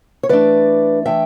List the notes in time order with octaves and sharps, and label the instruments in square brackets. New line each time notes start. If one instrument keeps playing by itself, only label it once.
[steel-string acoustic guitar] C#5
E3 A3 D4 B4 D5
E3 A3 D4 E5 G5